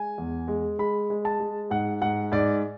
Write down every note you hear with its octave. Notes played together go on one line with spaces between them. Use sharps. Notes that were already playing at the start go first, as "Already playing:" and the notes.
Already playing: G#3 G#5
E2
G#3
G#3 B5
G#3
A5
G#3
G#2 F#5
G#2 F#5
G#2 D5